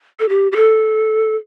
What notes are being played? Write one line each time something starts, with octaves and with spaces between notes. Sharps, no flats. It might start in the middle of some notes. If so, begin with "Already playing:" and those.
A4
G4
G4
A4